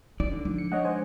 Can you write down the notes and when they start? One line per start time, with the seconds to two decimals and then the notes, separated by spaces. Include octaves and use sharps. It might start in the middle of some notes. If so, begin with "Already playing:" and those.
0.20 D#4 D5
0.32 D3
0.45 F3
0.58 C#7
0.72 G#3 D4 D#4 C#5 D#5 F#5
0.85 C5 G#5